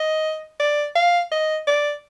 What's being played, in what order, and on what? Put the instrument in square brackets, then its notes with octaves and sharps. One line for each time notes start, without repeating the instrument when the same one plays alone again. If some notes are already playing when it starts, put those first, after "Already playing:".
Already playing: [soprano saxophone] D#5
D5
F5
D#5
D5